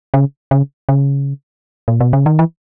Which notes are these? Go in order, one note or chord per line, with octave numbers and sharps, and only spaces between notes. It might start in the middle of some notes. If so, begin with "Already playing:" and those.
C#3
C#3
C#3
A#2
B2
C#3
D#3
E3